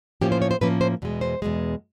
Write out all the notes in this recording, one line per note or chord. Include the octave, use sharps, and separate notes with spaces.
A2 F3 A#3 C#4 G4
C5
C#5
C5
A2 F3 A#3 C#4 B4
C5
E2 B2 G#3
C5
E2 B2 G#3